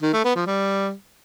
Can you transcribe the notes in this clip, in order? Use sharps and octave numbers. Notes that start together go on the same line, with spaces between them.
D#3
A3
B3
F3
G3